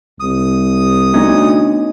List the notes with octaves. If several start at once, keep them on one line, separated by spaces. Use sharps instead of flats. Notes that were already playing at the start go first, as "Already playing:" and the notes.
C2 D#6
D2 B3 C#4 D#4